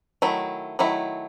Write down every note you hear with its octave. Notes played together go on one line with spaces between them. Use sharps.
D#3 F#3 A3 E4
D#3 F#3 A3 E4